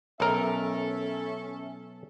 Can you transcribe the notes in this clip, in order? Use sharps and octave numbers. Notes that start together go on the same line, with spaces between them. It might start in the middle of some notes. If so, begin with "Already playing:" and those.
B1 C#4 A4 A#4 E5